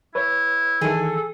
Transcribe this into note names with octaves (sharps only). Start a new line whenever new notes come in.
E4 B4 C#5
D#3 E3 G#4 A4